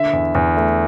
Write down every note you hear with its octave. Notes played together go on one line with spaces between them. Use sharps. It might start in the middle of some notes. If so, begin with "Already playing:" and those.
Already playing: D3 E5
E2
E2
A3